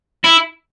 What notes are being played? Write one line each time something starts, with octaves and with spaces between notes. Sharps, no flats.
E4